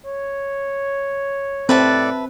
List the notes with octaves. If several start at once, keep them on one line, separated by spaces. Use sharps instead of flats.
C#5
A2 C4 A4 B4 D5 E5 A5